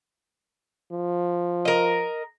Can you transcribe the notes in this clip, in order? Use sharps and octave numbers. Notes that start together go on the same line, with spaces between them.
F3
A#4 D#5